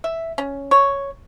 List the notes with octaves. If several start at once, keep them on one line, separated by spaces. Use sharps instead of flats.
E5
C#4
C#5